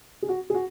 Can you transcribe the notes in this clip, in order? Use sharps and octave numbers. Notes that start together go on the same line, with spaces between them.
G#4
F#4
G#4
F#4